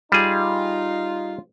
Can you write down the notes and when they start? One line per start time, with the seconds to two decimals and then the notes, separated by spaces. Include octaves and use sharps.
0.12 G3 D#4 F4 G#4